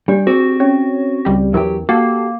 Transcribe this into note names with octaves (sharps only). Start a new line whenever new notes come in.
G3 D4 G4 D5
C4 F#4 G#4
C#4 C#5
C#2 G3 G4
E2 E3 F#3 G4 A#4
A#3 F#4 G4 A4